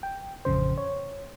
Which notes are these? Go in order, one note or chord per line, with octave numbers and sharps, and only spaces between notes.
G5
A1 F2 C#3 C5
C#5